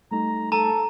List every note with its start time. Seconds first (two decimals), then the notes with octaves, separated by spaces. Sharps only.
0.11 G3 A3 D#4 A#5
0.52 A4 A5 A#5